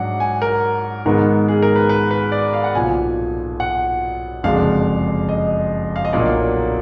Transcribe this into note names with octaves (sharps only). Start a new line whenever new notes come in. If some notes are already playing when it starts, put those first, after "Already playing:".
Already playing: G#2 F#3 D4 F#5
G#5
A#4
G#2 D#3 G#3 B3 A#4
G#4
A#4
B4
B4
B4
D5
F5
F#5
B1 A#2 F3 G#5
F#5
F#1 F2 D3 G#3 D4 F5
D#5
F5
D#5
B1 A#2 F#3 A#3 D4 D5